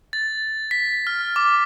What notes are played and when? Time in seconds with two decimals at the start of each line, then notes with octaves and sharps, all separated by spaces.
0.13 A6
0.71 B6
1.07 F6
1.36 D6